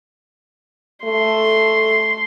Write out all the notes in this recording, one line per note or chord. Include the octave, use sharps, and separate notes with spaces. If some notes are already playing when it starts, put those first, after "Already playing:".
A3 C6